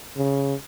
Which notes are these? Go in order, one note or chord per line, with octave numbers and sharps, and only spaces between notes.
C#3